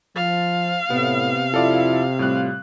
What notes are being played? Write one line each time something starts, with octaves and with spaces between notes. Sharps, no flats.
F3 F5 A6
A2 C3 B3
F2 E4 F4 A4 D5 A5
A2 G3 C4 F4 F#6